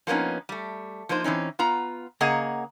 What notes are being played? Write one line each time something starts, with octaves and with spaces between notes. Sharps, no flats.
F3 A#3 B3 C#4 D#4
G3 A3
F3 A#3 D#4 C5
E3 C4 C#4 D#4
B3 F4 A#5
C#3 A#3 G#4 D#5 F#5 A#5